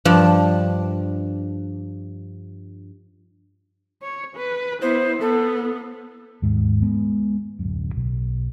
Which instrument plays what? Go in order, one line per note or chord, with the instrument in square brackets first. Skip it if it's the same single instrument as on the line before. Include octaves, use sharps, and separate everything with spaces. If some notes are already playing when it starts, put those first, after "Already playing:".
[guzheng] G2 F3 D4
[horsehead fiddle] C#5
B4
[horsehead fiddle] B3 E4 [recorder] C5
[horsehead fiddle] B3 [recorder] A4
[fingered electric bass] D#2 G#2
G#3 B3
D1 F#2
B1